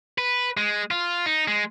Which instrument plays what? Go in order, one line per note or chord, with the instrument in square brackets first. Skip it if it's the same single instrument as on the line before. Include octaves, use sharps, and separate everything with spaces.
[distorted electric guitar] B4
G#3
F4
D#4
G#3